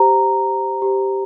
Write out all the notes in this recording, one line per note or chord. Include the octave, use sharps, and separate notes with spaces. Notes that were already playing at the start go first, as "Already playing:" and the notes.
Already playing: G4 C5 A#5
G4 C5